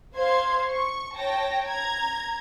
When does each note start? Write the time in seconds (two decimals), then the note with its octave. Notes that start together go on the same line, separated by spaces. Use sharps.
0.16 C5 F5 C6 G#6
0.72 C#6
1.15 C#5 G5 A5 A#6
1.66 A#5 G#6